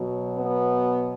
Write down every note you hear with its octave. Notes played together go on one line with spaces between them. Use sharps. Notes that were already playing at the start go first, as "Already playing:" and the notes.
Already playing: B2 F#3
B3